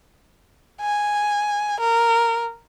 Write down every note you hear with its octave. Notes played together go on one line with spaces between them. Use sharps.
G#5
A#4